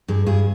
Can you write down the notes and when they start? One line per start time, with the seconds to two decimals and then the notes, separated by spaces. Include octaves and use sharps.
0.08 G2 G#4
0.26 G2 G#4